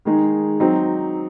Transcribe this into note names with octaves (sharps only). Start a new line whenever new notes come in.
D#3 G#3 D#4 G#4
F#3 C4 D#4